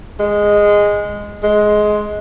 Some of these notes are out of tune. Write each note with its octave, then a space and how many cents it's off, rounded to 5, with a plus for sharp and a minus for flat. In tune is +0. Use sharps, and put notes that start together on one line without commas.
G#3 -10
G#3 +15